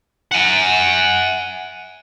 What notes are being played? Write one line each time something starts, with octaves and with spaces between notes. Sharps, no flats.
F#5 G#5